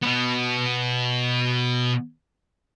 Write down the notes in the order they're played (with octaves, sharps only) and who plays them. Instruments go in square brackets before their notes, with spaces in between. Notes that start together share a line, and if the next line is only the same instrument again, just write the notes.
[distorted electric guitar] B2 B3